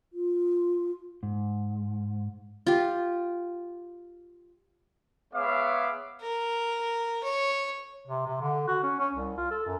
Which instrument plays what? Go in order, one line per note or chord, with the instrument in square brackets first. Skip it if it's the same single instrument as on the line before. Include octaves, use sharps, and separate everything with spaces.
[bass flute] F4
[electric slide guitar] G#2
[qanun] F4 G4
[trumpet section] G#3 B3 C#5 E5 F5 D6
[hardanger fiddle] A#4
C#5
[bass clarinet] C3
C3
D3
F#4
C#4
C#4
C2
F4
A4
F#2